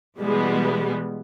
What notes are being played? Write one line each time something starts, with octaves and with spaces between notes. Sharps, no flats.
B2 E3 G3 G#3 B3